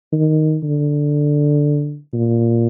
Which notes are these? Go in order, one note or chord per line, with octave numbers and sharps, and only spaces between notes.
D#3
D3
A#2